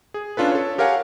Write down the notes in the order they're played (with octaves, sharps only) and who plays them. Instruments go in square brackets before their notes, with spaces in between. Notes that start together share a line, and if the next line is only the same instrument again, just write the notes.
[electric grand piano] G#4
C#4 D4 F4 A4 B4
A4 C#5
G4 A#4 C#5 F5 F#5 G#5